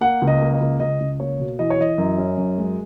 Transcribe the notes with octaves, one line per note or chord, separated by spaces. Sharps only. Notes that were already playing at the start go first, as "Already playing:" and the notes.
A#3 F#5
C#2
D#5
A#3
D#5
C#2
C#2 D#5
C#2
A#3 C#5
B2
E3 D#5
C#5
E3 D#5
F#2
C#4
F#2
G#3